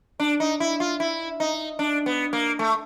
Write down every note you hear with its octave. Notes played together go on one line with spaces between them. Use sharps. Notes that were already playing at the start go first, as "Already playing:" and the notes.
D4
D#4
E4
F4
E4
D#4
D4
B3
A#3
A3